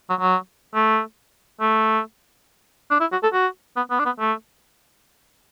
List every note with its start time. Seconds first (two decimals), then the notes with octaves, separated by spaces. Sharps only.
0.10 F#3
0.20 F#3
0.74 A3
1.60 A3
2.90 D4
3.00 E4
3.12 F#4
3.23 A4
3.33 F#4
3.77 B3
3.91 B3
3.99 D4
4.05 B3
4.20 A3